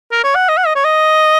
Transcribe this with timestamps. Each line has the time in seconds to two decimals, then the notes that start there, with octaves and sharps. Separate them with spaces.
0.12 A#4
0.24 C#5
0.35 F#5
0.49 D#5
0.57 F#5
0.66 D#5
0.75 C#5
0.84 D#5